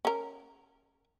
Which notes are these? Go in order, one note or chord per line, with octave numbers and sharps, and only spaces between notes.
C#4 A#4